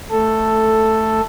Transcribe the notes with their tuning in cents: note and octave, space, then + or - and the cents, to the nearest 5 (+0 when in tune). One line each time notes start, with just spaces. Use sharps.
A3 +0 A4 +5